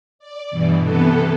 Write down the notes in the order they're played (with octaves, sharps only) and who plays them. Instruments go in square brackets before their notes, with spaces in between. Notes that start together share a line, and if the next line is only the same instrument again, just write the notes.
[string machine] D5
G2 B2 E3
C3 E3 B3 A4